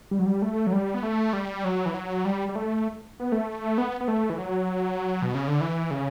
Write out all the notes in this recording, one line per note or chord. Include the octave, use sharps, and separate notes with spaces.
G3
F#3
G3
A3
F#3
G3
B3
A3
G3
F#3
E3
F#3
G3
G3
A3
B3
A3
B3
B3
A3
E3
F#3
B2
C#3
D3
E3
C#3